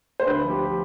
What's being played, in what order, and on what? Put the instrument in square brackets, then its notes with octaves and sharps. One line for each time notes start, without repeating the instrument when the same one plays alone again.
[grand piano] C5
D2 B4
F3
G4